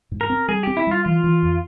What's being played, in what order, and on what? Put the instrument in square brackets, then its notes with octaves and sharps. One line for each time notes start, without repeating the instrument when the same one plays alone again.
[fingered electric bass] G#2
[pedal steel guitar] A#4
[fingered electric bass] C4
[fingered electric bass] G3 [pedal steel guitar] G#4
[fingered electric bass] C4 [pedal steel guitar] G4
[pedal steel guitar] E4
[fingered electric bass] G3 [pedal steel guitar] F4
[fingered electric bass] E3 [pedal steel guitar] F4
[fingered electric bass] E3
F2